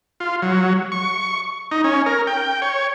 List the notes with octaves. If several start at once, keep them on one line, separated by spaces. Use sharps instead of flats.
F4
F#3
C#6
D#4
C#4
A#4
G5
C#5